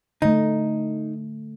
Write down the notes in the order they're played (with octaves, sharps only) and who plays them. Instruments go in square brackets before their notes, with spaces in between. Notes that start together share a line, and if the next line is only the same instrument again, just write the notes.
[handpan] D3 A3 [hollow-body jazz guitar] D#4